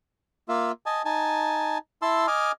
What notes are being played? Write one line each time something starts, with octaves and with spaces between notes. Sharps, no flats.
A#3 F4 E5
D#5 G#5 A5
D#4 G#5 A5
E4 A5 C6 E6
D#5 G#5 D6 F6